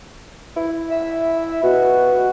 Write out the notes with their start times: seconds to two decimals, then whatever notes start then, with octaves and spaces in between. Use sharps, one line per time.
0.57 E4
0.90 E5
1.63 B2 F#4